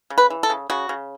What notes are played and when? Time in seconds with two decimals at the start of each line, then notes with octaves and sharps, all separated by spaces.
0.10 C#3
0.18 B4
0.30 E3
0.43 A4
0.50 C#3
0.70 C#3 F#4
0.89 C#3